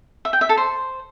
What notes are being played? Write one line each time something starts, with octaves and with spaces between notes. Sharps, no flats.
E5
G5
E5
A4
C5